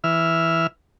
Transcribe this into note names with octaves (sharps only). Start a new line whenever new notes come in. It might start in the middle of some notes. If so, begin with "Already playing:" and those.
E3 E5 F6